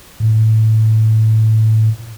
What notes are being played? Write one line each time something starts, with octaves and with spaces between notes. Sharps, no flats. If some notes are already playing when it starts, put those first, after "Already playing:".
A2